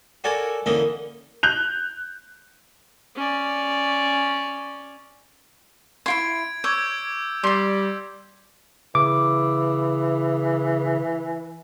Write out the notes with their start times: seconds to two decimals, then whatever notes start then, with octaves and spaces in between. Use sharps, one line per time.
0.24 F#4 A4 A#4 C#5 D5 G#5
0.66 D3 E3 A#3 C#4 D#4 A#4
1.43 F#6 G6 F7
3.16 C#4 D5
6.06 E4 F4 C6 G#6 D7
6.64 C#5 D6 E6 G6
7.43 G3 D5 C6
8.95 C#3 E3 D6